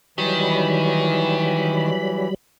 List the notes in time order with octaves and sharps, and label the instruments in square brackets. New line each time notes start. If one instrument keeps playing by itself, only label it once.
[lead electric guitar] D#3 [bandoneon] E3 [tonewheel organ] F#3 G3 B5